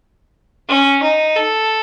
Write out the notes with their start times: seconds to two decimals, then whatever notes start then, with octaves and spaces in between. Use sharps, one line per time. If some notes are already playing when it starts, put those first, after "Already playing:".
0.68 C#4
1.02 D#4
1.35 A4